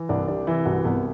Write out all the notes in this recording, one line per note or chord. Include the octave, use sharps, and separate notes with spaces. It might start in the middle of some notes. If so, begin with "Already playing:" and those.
Already playing: E3
C2 D4
C3 D4
E3 E4
C2 F#4
C2 B3